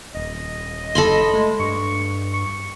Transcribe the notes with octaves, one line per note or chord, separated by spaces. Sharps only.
D#1 D#5
F#1 A4 B5 C6
G#3 A3
G2 C#6
C#6